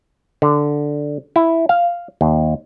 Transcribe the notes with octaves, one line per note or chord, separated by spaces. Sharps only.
D3
E4
F5
D#2